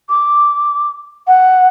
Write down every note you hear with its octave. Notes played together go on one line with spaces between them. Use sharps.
D6
F#5